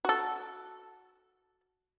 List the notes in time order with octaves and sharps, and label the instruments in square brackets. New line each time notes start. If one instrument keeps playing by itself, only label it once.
[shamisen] F#4 A4